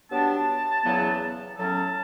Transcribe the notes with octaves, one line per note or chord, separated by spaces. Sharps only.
G2 F#3 B3 D4 A5
E2 C#3 F#3 B3
A2 F#3 C#4 A5